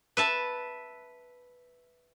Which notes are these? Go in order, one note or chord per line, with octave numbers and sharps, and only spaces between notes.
B4 E5 A5